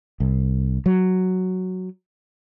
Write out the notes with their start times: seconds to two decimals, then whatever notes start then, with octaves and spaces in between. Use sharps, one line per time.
0.20 C2
0.86 F#3